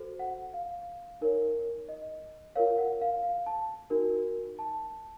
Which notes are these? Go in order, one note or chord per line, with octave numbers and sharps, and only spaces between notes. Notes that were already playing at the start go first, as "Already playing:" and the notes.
Already playing: F#4 A4 C5
F#5
F5
D#4 A#4 C#5
D#5
F4 A#4 C#5 F5
F#5
F5
F5
A5
D#4 F#4 A#4
A5